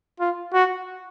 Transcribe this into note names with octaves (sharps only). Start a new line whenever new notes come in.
F4
F#4